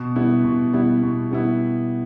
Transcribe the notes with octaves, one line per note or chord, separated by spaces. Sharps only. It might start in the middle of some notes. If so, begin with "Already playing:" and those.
Already playing: B2
G3 B3 E4
B2
G3 B3 E4
B2
G3 B3 E4